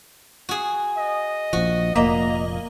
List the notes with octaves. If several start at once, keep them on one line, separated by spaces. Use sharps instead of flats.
F#4 G#4
D#5
A#1 F3 F#4
F1 A#2 A#3 D#5 E5 A#5